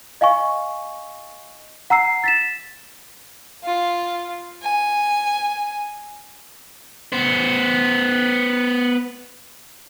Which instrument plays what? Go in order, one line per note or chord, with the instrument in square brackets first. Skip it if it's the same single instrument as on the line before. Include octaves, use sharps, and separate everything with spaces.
[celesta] D#5 F5 G#5 C#6
F#5 A#5 E6 C7
A6 B6 E7
[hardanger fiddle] F4
G#5
[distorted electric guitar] B3 C5